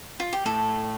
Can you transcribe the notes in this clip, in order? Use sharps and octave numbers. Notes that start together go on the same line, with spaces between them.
F4
G4
A2 A4